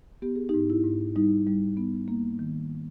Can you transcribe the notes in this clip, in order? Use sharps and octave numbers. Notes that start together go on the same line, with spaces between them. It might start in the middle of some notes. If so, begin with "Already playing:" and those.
B3 G4
G#4
D#4 G4
G#2
E4
G#2
G3 D#4
G3
B3
A#3
D#3